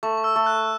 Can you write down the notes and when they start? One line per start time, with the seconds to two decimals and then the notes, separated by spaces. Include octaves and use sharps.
0.03 A3 C#6
0.17 C#6
0.24 E6
0.36 A3
0.46 F#6